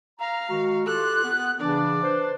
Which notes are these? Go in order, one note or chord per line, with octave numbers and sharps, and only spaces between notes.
F5 A#5
D#3 G#3 F#4
F4 G4 A4 F#6
B3
C#3 E3 D4 D5
D4 B4 C5